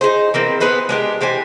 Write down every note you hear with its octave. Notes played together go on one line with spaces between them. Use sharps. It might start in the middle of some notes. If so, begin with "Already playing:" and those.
D#4 E4 G#4 C5
E3 A#3 C4
B3 G#4 B4 C5
G#3 D4 G4
E3 G4 C5 G#5